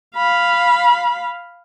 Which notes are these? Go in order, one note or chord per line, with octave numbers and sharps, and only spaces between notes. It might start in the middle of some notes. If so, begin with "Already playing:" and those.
F5 B5